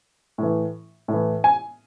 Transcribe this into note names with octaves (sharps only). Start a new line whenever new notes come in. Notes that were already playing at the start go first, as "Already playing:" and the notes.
A2 E3
A2 E3
G#5